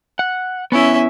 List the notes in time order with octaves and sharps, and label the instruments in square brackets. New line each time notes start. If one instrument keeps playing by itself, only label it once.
[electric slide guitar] F#5
[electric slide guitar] B3 E4 [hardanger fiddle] C#4 E5